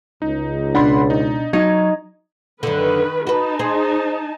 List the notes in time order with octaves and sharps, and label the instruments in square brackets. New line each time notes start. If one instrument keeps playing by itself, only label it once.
[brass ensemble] C#2 [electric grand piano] D#4
[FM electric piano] B2 D4 [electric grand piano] F#5 B5 C6
[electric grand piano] D#4
[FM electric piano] F#3 [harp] D#4 [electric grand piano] G#6
[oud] F#2 D3 [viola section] D#3 B4
[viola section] D#4 A5 [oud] F#4 B4
[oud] G#4 C5